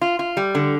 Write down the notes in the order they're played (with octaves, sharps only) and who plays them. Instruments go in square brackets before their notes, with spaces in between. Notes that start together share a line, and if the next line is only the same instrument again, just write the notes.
[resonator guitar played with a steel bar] F4
F4
G3
D3